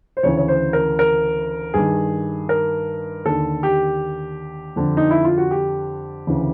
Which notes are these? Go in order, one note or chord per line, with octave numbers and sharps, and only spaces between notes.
C5
D2 C#3 E3 C#5
C#5
C5
A#4
A#4
G2 D#3 G#4
A#4
D#2 D3 A4
G4
F2 D3
D#4
E4
F4
F#4
G4
D2 C#3 E3